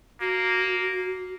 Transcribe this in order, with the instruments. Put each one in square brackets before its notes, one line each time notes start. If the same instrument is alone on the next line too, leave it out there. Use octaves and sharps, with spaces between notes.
[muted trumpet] A#3 [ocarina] F#4